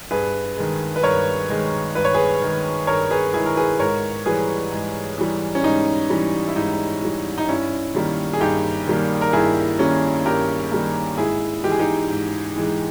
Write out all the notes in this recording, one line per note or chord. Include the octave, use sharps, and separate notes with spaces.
G2 G#4 B4
D#3 G#3
B4
G2 A#4 C#5
D#3 G#3
G2 B4
C#5
G#4 B4
D#3 G#3
G2 A#4 C#5
G#4 B4
D#3 G#3 E4 G#4
A#4
G#4 B4
G#2 A#4 C#5
E3 G3 G#4 B4
G#2
E3 G3
C#4
G#2 D#4
E3 G3
E4
G#2 D#4
E3 G3
D#4
G2 C#4 E4
D#3 G3 A#3
G#4
G2 D#4 G4
D#3 G3 A#3
A#4
G2 E4 G#4
D#3 G3 A#3 C#4
G2 G4 A#4
D#3 G3 A#3
G#2 E4 G#4
E3 G#3 G4
G#4
D#4 G4
G#2
E3 G#3